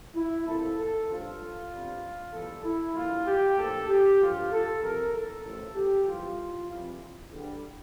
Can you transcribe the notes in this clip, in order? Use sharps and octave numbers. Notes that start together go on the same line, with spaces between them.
E4
C2 A#2 F3 A4
A4
A1 G2 F3 F4
G1 F2 C3 G3
E2 E3 G3 A4
E4
A#1 A#2 G3 F4
G4
A#1 A2 F3 A4
G4
A1 G2 F3 F4
A4
C2 C3 F3 A#4
A4
A1 A2 F3
G4
F2 E3 G3 F4
F2 E3 G3
E2 D3 G3